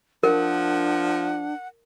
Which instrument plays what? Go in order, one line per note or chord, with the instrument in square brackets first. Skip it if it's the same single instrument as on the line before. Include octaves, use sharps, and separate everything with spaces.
[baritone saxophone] F3 [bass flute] D4 [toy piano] A#4 [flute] F#5